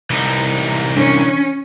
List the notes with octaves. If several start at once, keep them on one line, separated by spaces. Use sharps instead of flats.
C2 E3 D#4
C#4 D4